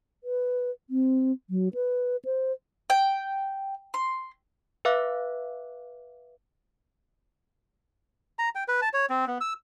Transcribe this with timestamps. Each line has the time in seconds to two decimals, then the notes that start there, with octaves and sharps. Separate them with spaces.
0.24 B4
0.90 C4
1.50 F#3
1.74 B4
2.25 C5
2.90 G5
3.94 C6
4.85 B4 E5 F5 D6 F#6
8.39 A#5
8.55 G5
8.68 B4
8.82 A5
8.94 C#5
9.10 C4
9.27 B3
9.41 E6